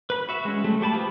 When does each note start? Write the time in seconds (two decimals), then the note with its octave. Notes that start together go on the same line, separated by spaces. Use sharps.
0.10 B4 B5
0.29 F#4 E5
0.45 G#3 C#4
0.64 F#3 G3 A3
0.81 A3 G4 A5 B5
0.93 F4 G4 G#4 B4 C5